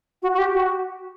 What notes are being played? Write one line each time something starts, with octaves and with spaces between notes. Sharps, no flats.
F#4
F#4
G4
F#4